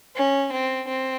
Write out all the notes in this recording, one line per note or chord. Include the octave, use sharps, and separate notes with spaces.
C#4
C4
C4